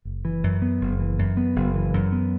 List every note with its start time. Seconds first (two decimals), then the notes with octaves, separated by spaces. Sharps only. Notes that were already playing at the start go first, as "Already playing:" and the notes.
0.05 F#1
0.25 E3
0.44 F#2
0.62 B3
0.81 F#1
0.99 E3
1.19 F#2
1.37 B3
1.56 F#1
1.76 E3
1.94 F#2
2.12 B3